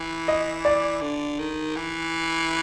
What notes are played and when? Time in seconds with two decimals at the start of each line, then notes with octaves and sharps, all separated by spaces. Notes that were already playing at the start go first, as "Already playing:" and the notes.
Already playing: E3
0.28 D#5
0.65 D5
1.02 D3
1.39 D#3
1.76 E3